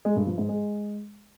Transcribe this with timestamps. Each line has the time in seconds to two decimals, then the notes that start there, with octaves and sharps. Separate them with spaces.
0.05 G#3
0.16 G2
0.27 F3
0.38 G#2
0.49 G#3